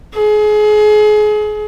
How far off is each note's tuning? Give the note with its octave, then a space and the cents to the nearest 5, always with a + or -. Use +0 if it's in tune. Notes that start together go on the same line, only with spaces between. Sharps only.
G#4 +30